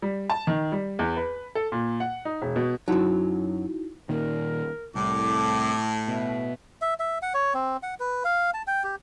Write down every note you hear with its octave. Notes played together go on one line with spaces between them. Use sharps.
G3
A5
D#3
G3
E2
B4
A4
A#2
F#5
D#4
E1
B2
F#2 F#3 D#4 E4 F#4
A#2 D#3 A#4
C2 A2 D6
B2 E5
E5
E5
F#5
C#5
C4
F#5
B4
F5
A5
G5
G4